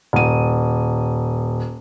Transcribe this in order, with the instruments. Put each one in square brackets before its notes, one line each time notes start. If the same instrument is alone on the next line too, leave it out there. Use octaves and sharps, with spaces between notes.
[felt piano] D#1 D#7